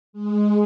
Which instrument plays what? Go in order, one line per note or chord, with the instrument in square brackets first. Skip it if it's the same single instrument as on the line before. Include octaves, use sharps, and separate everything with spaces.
[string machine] G#3